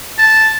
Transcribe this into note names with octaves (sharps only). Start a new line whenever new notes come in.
A5